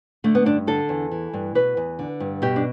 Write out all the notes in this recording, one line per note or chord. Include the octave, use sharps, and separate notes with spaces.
D3 A3
B3
G2 D4
D3 A4
E2
E3
G2
B2 B4
E2
D3
G2
B2 G4
D4